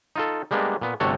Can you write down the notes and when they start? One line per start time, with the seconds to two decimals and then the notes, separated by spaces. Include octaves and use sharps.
0.16 D#4 F4 A4
0.51 G3 G#3 A#3 B3 D4
0.81 A#2 B3
1.00 G1 C3 A3 F#4 A4 C#5